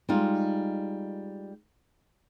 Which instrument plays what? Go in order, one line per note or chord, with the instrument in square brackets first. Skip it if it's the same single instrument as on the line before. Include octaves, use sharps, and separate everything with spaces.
[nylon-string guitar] G3 G#3 D#4 F4